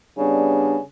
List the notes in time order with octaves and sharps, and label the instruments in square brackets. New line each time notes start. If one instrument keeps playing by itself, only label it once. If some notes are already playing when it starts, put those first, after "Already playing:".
[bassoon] C#3 [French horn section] G3 B3 D4